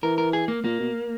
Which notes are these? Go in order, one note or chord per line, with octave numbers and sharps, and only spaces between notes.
E3 A#4
A#4
G#4
A#3
A#2 A#3
B2